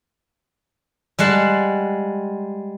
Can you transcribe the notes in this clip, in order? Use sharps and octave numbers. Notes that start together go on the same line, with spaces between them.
G3 G#3 F#5 A5